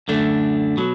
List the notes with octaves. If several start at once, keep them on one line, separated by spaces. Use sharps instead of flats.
F#2 D3 A3 D4
B2 F#3